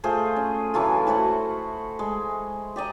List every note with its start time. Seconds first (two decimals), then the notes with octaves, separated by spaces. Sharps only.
0.04 A3 F4 G#4 C5
0.36 C#4
0.74 E3 F#3 A3 F4
1.07 E4 F#4 C5 F#5
1.99 G#3
2.76 G4 D5 D#5 A#5